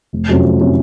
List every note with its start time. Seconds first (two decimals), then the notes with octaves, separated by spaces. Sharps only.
0.13 F1
0.29 F2 C3 F#3 C#4
0.44 F1
0.60 C3 F#3 C#4